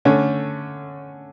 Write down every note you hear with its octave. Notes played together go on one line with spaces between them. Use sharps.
D3 A3 C#4